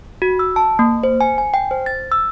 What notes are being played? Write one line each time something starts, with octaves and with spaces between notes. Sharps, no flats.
F#4
E6
A5
A#3
C5
G#5
G#5
G5
C5
A6
E6